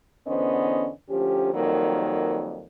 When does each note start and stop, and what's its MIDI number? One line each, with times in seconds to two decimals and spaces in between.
0.27 0.90 40
0.27 0.90 50
0.27 0.90 59
0.27 0.90 61
0.27 0.90 72
0.27 0.90 75
1.09 1.53 38
1.09 1.53 53
1.09 1.53 61
1.09 1.53 67
1.53 2.66 41
1.53 2.66 51
1.53 2.66 54
1.53 2.66 55
1.53 2.66 58